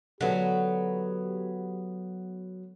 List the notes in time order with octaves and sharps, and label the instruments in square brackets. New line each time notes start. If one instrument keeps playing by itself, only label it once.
[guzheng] D3 [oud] F#3 B3 [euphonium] G4